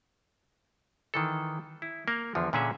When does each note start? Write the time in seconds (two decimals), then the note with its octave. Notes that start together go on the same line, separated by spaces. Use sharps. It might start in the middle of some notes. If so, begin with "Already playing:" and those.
1.14 D#3 E3 A4
1.82 E4
2.08 A#3 A#4
2.35 E2 D3 F3
2.53 A#2 D3 C#4 G#4 E5